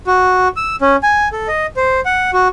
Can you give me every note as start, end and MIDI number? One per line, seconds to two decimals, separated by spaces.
0.07 0.48 66
0.57 0.76 88
0.81 0.96 61
1.03 1.28 80
1.33 1.48 69
1.48 1.66 75
1.77 2.00 72
2.05 2.31 78
2.33 2.48 66